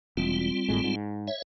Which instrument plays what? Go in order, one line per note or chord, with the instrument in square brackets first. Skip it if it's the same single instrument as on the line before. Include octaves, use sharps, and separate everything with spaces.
[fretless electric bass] E1 [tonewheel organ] G3 C4 F4
[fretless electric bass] G#1 A2 G#3
G#2
[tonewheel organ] C#5 E5